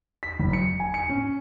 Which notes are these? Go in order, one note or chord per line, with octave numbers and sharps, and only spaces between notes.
B6
F#1
C#7
G#5
C#7
C#4